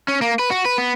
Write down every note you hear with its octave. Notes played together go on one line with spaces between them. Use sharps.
C#4
A#3
B4
F#4
B4
B3